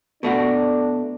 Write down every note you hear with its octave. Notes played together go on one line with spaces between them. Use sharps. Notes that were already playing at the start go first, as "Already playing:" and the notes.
B2 A3 D4 F#4